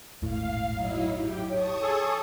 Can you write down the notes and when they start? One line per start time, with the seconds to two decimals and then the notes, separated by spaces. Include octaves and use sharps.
0.22 D#1 G#1 A2 F5
0.70 F#3 D#4 E4
1.20 G4 G5
1.50 C#5 A5 C#6 D#6
1.82 G#4 A4